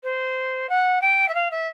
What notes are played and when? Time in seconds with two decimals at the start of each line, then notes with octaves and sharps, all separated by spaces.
0.03 C5
0.69 F#5
1.01 G5
1.28 E5
1.34 F5
1.50 E5